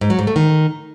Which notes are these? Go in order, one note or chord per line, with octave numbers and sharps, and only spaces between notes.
G#2
F#3
G#2
A3
D#3